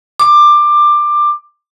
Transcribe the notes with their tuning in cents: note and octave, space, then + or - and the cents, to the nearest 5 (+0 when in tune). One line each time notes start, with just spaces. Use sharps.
D6 +20